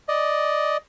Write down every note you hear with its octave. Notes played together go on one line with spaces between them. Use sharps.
D5 D#5